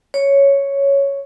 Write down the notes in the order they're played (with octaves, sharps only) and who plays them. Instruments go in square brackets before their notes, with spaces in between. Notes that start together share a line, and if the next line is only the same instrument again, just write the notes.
[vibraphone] C#5